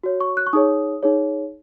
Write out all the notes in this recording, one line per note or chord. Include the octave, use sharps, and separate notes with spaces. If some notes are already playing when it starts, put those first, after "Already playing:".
F#4 C#5
C#6
F#6
C#6
D#4 G#4 C#5 D#6
D#4 G#4 C#5